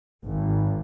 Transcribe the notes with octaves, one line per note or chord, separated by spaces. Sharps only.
G#1